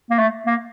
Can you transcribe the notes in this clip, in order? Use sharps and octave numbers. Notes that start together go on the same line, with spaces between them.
A#3
A3
A#3